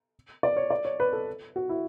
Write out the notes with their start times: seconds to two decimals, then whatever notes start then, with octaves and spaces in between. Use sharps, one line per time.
0.43 D5
0.56 C#5
0.70 D5
0.85 C#5
1.00 B4
1.13 A4
1.56 F#4
1.69 E4